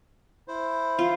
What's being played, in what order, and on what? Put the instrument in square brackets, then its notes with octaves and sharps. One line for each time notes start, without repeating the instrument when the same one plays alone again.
[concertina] E4 C5
[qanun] F4